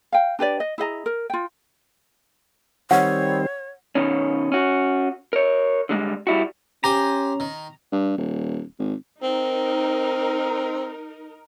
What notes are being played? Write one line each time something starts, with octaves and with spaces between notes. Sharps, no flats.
F5 G5
D4 G4 B4 D5
D#5
E4 G#4 D#5 A#5
A#4
F4 G5
D#3 G3 C4 C#5 F#5
B2 D#3 C#4
C#4 F#4
A#4 C#5
D3 G3 G#3
G3 E4 F#4
C#4 G4 C5 G#5 A#5
D#3
G2
D#1
G#1
C4 D#4 A#4